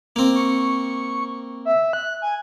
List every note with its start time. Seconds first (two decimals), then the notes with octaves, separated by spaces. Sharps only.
0.16 A#3 C4
0.35 C#6
1.65 E5
1.93 F#6
2.22 G#5